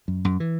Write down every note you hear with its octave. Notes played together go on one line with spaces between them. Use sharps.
F#2
F#2
E3